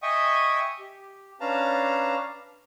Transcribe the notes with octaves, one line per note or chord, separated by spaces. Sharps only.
D#5 E5 G5 G#5 C#6 D#6
G4
C#4 D4 B4 F5 A5 A#5